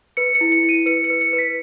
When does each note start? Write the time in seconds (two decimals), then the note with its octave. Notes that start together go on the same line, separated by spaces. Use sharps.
0.17 B4 C#7
0.35 C#7
0.41 E4
0.52 C#7
0.63 E4
0.69 D#7
0.86 B4 C#7
1.04 C#7
1.10 B4
1.21 C#7
1.33 B4
1.38 B6